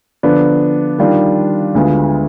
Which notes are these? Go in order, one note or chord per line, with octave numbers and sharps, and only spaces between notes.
D3 F3 B3 D4
D#3 G3 D4 F4
D2 D3 G#3 B3 F4